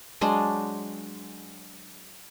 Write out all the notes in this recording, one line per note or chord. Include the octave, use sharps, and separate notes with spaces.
F#3 G#3 D4 C5